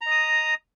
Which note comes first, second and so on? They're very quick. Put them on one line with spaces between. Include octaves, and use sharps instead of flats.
A#5 D#5 D#6